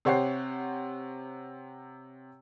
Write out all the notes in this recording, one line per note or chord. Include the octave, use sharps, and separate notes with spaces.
C3 C5 C#5 F#5 G5 C7